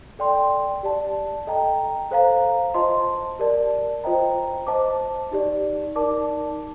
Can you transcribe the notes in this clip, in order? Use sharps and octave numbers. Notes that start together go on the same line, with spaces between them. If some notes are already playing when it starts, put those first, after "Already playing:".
A4 D5 G5 C6
G4 D5 A5
A4 D#5 G5 A#5
A4 C5 F5 A#5
F4 C5 D#5 A5 C6
G4 A#4 D5 A5
F4 C5 D#5 G5 A#5
C5 D#5 A5 D6
D#4 G4 D5
D#4 A#4 D5 A5 D6